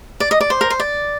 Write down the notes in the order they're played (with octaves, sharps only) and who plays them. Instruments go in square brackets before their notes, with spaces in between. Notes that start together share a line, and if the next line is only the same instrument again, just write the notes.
[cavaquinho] D5
D#5
D5
C5
A#4
C5
D5